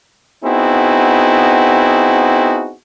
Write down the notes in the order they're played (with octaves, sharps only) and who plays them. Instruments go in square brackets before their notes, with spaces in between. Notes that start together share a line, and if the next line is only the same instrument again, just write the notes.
[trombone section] B3 C4 D#4 E4 F#4 G#4